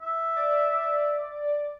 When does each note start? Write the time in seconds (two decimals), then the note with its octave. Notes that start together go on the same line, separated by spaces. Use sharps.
0.02 E5
0.36 D5